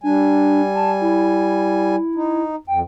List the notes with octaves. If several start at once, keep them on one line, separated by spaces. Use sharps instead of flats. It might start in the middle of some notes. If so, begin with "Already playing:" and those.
G3 D4 G#5
A5
E4
D#4
F2 G5